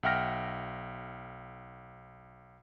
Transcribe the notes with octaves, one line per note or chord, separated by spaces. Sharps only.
B1 E5 F#5 G5 F6 A#6